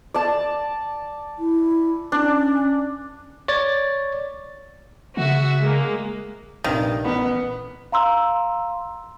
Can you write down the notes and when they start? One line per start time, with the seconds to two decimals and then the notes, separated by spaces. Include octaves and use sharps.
0.14 D5 A5
1.39 E4
2.12 C#4 D4
3.48 C#5 D5 A6
5.17 C#3 F#4 E5
5.61 G#3 A#3
6.64 A#1 G2 C3 D#3
7.04 A1 B3
7.92 F5 A#5 C6 E6